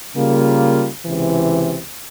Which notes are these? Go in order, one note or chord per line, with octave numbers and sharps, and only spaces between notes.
C#3 G3 A#3 F4
C#2 C3 E3